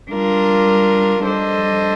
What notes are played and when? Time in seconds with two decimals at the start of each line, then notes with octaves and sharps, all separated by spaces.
0.10 G3 D4 F4 A#4
1.24 G3 D4 A4 C5 D#5